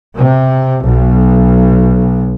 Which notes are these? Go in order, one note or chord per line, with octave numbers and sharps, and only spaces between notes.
C3
B1